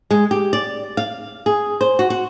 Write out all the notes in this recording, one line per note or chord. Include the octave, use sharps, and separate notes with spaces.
G#3
G4
D5
F5
G#4
C5
F#4
F#4